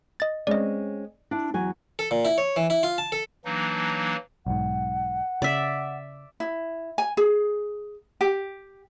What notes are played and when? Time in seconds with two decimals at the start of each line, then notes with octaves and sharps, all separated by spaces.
0.20 D#5 A6
0.47 G#3 C4 C#4 D5 D#5
1.31 D4 E4
1.54 E2 F#3 G#5
1.99 A4
2.11 A#2
2.25 E4
2.38 C#5
2.56 E3
2.70 E4
2.83 F4
2.98 A5
3.12 A4
3.45 E3 F#3 A#3 D4 D#4
4.47 B1 G#2 F#5
5.42 C#3 D5 E5
6.40 E4
6.98 G#5
7.17 G#4
8.21 G4